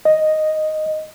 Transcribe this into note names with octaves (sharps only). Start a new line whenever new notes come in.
D#5